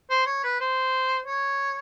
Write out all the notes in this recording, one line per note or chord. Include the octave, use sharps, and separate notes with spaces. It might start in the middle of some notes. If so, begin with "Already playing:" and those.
C5
C#5
B4
C5
C#5